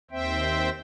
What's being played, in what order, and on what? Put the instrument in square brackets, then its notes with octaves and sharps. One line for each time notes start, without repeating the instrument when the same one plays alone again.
[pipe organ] D#2 C4 C5 E5 G5